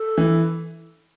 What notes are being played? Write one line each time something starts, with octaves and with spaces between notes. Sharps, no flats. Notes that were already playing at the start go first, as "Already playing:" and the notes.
Already playing: A4
E3